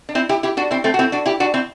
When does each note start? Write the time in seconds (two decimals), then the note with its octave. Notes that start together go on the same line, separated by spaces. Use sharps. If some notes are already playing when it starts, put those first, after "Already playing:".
0.09 D4
0.15 C4 E4
0.29 E4 G4
0.43 E4 G4
0.57 D4 F#4
0.71 C4 E4
0.84 A3 C4
0.94 F#4
0.99 C4 E4
1.12 D4 F#4
1.26 E4 G4
1.40 D4 F#4
1.54 C4 E4